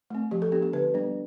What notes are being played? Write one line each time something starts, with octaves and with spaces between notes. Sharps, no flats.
A3 C4
F3 G4
A4
B3 D4 G4
G4
D3 B4
G3 B3 D4